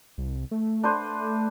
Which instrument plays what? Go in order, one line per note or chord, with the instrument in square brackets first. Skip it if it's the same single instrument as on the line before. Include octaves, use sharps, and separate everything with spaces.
[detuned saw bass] C2
A3
[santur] D4 B4 C5